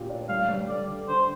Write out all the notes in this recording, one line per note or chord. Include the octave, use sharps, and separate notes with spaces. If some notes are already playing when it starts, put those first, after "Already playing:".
Already playing: A#2 G4
D4
G3 F5
G3
D3 D5
D3
D3 C5